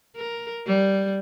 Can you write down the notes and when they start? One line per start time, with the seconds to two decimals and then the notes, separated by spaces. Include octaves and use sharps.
0.16 A#4
0.66 G3